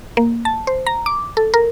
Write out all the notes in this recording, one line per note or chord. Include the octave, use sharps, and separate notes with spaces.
A#3
A5
C5
A#5
D6
A4
A#4